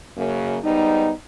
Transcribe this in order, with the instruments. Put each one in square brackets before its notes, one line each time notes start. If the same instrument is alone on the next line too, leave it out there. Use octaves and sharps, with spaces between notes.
[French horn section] F#2 C#3 A#3
G#2 G3 B3 D#4